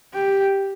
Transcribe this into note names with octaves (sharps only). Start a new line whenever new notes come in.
G4